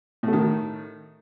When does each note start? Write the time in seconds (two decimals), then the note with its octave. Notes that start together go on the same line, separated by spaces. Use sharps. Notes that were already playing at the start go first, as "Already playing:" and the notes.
0.23 A2
0.28 A3
0.33 D#3